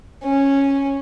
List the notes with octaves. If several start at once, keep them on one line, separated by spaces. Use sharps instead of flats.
C#4